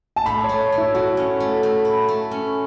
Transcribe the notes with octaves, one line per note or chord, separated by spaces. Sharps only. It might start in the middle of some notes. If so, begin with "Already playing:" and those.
A5
A2 B5
C#5
A3
A3
E4
A3 F#4
C#4
A3
A3
E4
A3
C#4